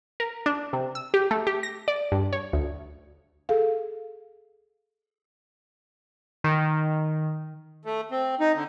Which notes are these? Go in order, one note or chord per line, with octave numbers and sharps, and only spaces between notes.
A#4
D4
C3
E6
G4
A3
G4
A#6
D5
G2
C#5
D2
G#4 A4 F5
D#3
A3
C4
D#4
D3